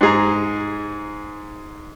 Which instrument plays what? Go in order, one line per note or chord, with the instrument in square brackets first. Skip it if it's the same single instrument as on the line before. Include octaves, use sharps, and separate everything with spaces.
[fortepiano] G#2 G#4 A#5